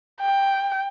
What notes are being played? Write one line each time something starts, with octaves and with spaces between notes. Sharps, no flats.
G5